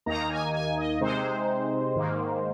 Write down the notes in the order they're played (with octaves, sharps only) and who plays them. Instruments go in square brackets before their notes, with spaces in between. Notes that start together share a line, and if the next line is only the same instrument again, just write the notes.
[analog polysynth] D#2 D#3 A#3 D#4 A#5
G#5
G#5
D#5
C3 G#3 C4 D#4 C5
G#2 D#3 A#3